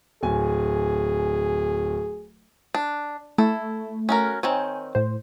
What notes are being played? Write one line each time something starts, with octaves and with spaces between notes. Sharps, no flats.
D1 G#4 G#5
D4
A3 E4 A4
C#4 F#4 A#4
D#3 C4 C#5 G#5
A2 C5